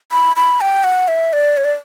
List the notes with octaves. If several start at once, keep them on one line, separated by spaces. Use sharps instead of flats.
B5
B5
G5
F#5
E5
D5
C#5
D5